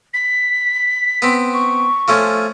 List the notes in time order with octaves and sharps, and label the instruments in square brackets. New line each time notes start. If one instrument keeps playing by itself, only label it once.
[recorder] B6
[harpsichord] B3 C4
[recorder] C#6
[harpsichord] F3 A3 C#4